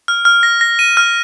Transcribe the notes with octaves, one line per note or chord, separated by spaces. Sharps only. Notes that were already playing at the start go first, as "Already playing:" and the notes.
F6
F6
A#6
A#6
D#7
F6